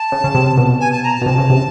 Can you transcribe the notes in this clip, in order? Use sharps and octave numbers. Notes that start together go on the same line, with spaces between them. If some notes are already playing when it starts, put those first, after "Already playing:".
Already playing: A5
C#3
C#3
C3
B2
G#5
A5
A#5
A5
B2
C3 A5
C#3
C3